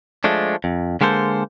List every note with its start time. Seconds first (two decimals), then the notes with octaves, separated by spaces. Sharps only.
0.24 F3 G#3 A3 D4
0.64 F2
1.01 D3 G#3 A#3 A4 C5